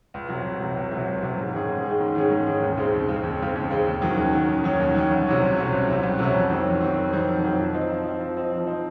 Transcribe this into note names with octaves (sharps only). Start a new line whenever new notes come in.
C#2
C3 F#3
C#2
C3 F#3
C#2
C3 F#3
C#2
C3 F#3
G#2
D#3 G#3 C#4 G#4
G#2
D#3 G#3 C#4 G#4
G#2
D#3 G#3 C#4 G#4
G#2
D#3 G#3 C#4 G#4
D#2
C#3 G#3 C4
D#2
C#3 G#3 C4
D#2
C#3 G#3 C4
D#2
C#3 G#3 C4
D#2
D#3 F#3 C#4
D#2
D#3 F#3 C#4
D#2
D#3 F#3 C#4
D#2
D#3 F#3 C#4
C2
C3 F#3 C#4
C2
C3 F#3 C#4
C2
C3 F#3 C#4
C2
C3 F#3 C#4
F2
D#3 F#3 C4
F2
D#3 F#3 C4
F2
D#3 F#3 C4
F2
D#3 F#3 C4
F3
C4 D#4
F3
C4 D#4
F3
C4 D#4
F3
C4 D#4